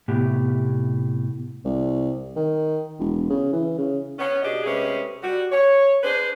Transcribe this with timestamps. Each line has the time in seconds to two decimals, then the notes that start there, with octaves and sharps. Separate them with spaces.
0.08 A2 C3 B3 G4
1.65 C2
2.36 D#3
3.00 E1
3.30 C#3
3.53 E3
3.78 C#3
4.19 B3 C#4
4.43 B2 D4 G4 G#4 D#5
4.64 C3 G#3 A3 C#4 G#4 B4
5.22 G3 F#4
5.51 C#5
6.03 D4 G#4 B4 C5